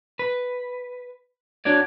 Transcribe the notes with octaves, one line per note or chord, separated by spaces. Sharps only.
B4
D4 F#4 C#5 D5